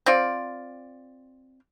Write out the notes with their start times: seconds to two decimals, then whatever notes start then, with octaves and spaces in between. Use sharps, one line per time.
0.06 C4 F4 D5